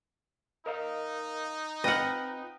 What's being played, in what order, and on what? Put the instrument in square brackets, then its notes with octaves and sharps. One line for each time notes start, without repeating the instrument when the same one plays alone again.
[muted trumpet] D#4 [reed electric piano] A#4 D#5 F5
[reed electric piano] C4 F4 [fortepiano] B4 G5 F6 [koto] D#5 F#5